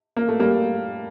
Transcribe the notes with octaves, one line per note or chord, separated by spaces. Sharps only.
A#3
A3
G3 A#3